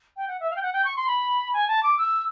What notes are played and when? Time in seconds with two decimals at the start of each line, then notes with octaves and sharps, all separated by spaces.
0.17 G5
0.28 F#5
0.40 E5
0.50 F5
0.56 G5
0.62 F#5
0.73 G5
0.85 C#6
0.97 C6
1.07 B5
1.53 G#5
1.68 A5
1.83 D6
1.98 E6